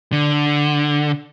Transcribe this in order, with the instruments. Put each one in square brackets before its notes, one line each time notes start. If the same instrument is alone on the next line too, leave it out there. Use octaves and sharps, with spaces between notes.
[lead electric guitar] D3